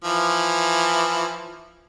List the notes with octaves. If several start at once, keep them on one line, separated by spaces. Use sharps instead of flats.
E3 F3